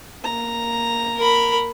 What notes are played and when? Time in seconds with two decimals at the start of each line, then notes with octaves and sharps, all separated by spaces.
0.24 A#3 A#5
1.17 A#4 B5